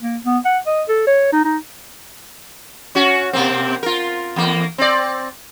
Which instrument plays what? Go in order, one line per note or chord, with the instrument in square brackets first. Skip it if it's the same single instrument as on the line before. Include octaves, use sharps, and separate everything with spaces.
[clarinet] A#3
B3
F#5
D#5
A4
C#5
D#4
D#4
[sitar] C#4 F#4
B2 A#3 C4
F4 A#4
E2 A#3
C4 D5